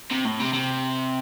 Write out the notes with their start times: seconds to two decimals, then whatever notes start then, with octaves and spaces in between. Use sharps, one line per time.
0.11 C3
0.25 A2
0.39 C3
0.53 C3